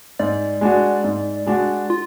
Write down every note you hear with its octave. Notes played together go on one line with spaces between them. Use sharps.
G#2 D5
G#3 D4 F#4
G#2
G#3 D4 F#4
F4